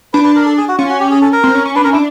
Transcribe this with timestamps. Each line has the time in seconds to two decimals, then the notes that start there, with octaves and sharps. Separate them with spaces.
0.13 D4 B4
0.24 B4
0.36 A#4
0.46 A4
0.58 G#4
0.68 F#4
0.78 C#4 F4
0.89 F#4
1.00 G4
1.11 G#4
1.21 A4
1.33 A#4
1.44 C4
1.55 C#4
1.66 C#4
1.75 D4 B4
1.84 C#4 A#4
1.92 D4 E4